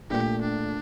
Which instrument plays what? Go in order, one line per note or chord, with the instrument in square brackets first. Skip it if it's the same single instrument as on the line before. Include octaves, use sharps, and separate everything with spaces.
[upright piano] A#1 A#2 A3 [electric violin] G4
[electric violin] D4